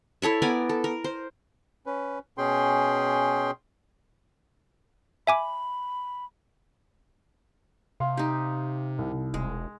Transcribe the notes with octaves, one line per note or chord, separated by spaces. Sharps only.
E4 A4 C#5 E5
B3 A#4 D5 G#5
A4
A#4
C5
C#4 B4
B2 C#4 G#4 G5 C6
E5 G#5 B5 D6
C3 F5 C6
D#4 G4
C2
E1 G#3